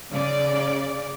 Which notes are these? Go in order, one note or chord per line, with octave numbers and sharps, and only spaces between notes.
C#3 D5